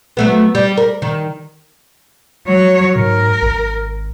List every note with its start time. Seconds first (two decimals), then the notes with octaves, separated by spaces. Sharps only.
0.17 F#3 A3 B3
0.55 G3
0.78 A#4
1.02 D#3
2.48 F#3 C#5
2.96 G#2 A#4
3.42 G#1